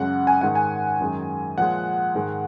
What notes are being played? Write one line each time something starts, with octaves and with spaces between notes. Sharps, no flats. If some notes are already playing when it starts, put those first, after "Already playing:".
Already playing: F#2 C#3 G#3 F#5
G#5
G#2 D#3 G#3 F#5
G#5
F#2 D#3 G#3
A#2 F3 G#3 F#5
G#2 D#3 G#3